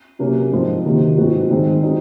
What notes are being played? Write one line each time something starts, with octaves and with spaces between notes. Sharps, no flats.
C3 F#3 A#3 C#4
G#2 F3 C4 F4
C3 D#3 F#3 A#3
G#2 F#3 C4 F#4
G#2 D#3 G#3 C4
F#3 C4 D#4